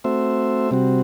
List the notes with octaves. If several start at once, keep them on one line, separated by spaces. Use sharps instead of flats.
A3 C4 F#4 C5 E5
C3 G3 C4 F#4